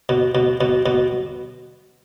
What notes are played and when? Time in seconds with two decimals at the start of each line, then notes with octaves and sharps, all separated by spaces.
0.09 B2
0.35 B2
0.61 B2
0.86 B2